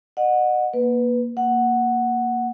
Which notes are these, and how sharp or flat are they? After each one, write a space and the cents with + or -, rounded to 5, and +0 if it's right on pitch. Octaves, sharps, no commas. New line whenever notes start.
D#5 -35 F#5 -15
A#3 +20 B4 +0
A#3 +0 F#5 +0